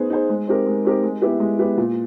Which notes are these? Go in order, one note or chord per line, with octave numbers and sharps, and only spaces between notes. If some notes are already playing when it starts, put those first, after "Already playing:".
Already playing: B3 D#4 G#4 C5
D#4 G#4 C5
G#3
C4 D#4 G4 A#4
G#3
C4 D#4 G4 A#4
G#3
B3 E4 G4 B4
G#3
B3 E4 G4 B4
A#2